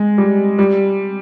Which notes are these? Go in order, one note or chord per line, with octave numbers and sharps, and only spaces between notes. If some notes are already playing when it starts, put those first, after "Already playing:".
Already playing: G#3
G3
G3